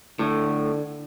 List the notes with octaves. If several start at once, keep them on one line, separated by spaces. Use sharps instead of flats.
A2 D3